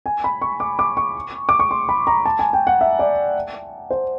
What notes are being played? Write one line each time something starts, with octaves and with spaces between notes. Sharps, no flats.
G#5
B5
C#6
D6
D6
C#6
D6
C#6
C6
B5
A#5
A5
G#5
G5
F#5
E5
D5
C5